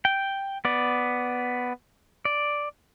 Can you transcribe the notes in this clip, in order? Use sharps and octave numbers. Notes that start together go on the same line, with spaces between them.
G5
B3 D5
D5